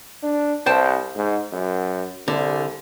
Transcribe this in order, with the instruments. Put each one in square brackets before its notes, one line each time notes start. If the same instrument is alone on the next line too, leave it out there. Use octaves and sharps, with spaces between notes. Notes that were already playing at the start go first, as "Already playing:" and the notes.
[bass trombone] D4
[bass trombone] C2 [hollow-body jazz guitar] C5 G5 A5
[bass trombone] G#2
F#2
[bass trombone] C2 [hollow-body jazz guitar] D3